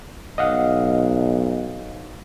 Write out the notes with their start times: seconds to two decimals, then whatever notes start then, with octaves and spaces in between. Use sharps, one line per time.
0.38 B1 D#5 F5 F#5